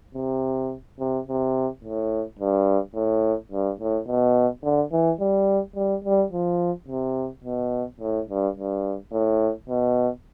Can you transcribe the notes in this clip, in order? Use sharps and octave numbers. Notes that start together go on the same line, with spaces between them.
C3
C3
C3
A2
G2
A2
G2
A2
B2
D3
E3
G3
G3
G3
F3
C3
B2
A2
G2
G2
A2
B2